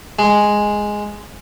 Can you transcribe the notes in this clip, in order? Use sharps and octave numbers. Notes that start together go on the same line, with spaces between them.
G#3